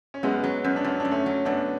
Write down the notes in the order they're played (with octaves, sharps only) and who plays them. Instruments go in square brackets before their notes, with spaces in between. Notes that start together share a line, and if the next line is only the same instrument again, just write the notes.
[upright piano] C#4
[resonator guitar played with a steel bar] F#2 [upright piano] G#3 B3
[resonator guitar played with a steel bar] F#3
[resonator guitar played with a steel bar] F#2 [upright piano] C#4
[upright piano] D4
[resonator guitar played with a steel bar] F#2 [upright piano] C#4
[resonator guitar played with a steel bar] F#2 [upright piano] D4
[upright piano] A3 C#4
[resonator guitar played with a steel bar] F#3
[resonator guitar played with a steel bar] F#2 [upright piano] B3 D4